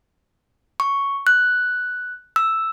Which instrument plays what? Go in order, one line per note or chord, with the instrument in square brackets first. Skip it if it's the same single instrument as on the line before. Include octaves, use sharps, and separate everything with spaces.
[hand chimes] C#6
F#6
E6